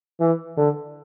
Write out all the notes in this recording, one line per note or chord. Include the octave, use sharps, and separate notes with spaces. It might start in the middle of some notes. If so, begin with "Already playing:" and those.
E3
D3